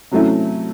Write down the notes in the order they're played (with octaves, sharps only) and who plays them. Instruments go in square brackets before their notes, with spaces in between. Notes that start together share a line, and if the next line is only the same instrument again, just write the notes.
[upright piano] C3 F#3 A3 C#4 E4